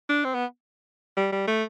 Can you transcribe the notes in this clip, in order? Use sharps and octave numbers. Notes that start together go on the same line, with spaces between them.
D4
C4
B3
G3
G3
A3